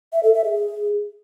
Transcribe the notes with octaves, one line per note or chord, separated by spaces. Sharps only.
E5
A4
E5
G#4